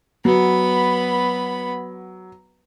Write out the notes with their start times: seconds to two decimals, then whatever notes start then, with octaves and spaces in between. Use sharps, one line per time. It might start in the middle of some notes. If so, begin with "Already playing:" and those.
0.25 F#3 B3 B5